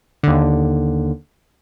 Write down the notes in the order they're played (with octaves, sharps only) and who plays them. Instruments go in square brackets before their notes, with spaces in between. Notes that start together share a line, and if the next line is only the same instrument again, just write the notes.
[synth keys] D#2 D3